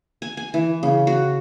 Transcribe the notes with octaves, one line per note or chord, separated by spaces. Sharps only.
G#5
G#5
E3
C#3
F#4